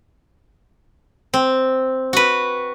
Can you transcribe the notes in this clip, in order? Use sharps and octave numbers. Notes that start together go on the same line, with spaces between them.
C4
F#4 B4